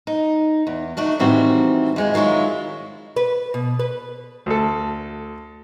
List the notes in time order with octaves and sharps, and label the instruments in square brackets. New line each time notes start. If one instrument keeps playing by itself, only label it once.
[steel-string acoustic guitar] D#4
E2
D#3 A3 D4 F#4
A2 D#3 E3 G3 C4 F#4
F2 G#3 E4
D#3 F#3 G#3 E4 F4
[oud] B4
B2
B4
[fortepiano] D2 A4